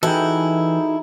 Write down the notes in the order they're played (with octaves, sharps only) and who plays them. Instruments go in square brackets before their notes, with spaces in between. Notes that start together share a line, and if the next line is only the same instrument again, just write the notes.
[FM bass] E3 [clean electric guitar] D#4 G#4 A4 [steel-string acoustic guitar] E4 [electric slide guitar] F#4 G5